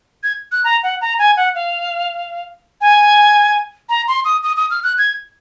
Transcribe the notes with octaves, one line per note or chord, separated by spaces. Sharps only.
G#6
F#6
A#5
F#5
A#5
G#5
F#5
F5
G#5
A#5
C6
D#6
D#6
D#6
F6
F#6
G#6